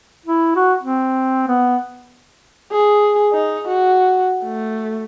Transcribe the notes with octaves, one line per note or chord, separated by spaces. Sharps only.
E4
F#4
C4
B3
G#4
D#4
F#4
A3